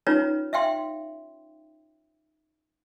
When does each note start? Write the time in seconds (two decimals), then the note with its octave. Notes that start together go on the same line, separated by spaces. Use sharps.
0.07 C#4 D#4 F4 B4 C#5 A#5
0.53 E5 F5 G5 C6